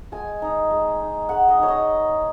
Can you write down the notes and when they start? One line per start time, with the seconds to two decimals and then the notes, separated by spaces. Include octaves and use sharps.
0.12 G#3 G#5
0.42 D#4
0.70 G#3
1.00 D#4
1.29 G#3 F#5
1.48 D#5
1.59 D#4 C#5
1.68 D#5